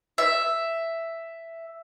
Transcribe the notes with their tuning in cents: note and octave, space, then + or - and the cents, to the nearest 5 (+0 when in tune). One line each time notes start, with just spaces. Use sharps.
E5 +5